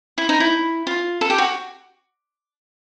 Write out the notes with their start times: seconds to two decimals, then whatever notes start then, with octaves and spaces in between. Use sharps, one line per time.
0.18 E4
0.29 D#4
0.40 E4
0.87 F4
1.21 A4
1.30 G4
1.38 F#4